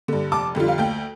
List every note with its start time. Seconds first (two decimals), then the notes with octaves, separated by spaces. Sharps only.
0.08 G2 D3
0.31 F1 A5 D6
0.55 F2 D3 G3 F4
0.68 F5
0.78 D2 G5